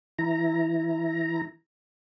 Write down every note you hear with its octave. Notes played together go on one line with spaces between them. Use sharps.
E3 E4 A#5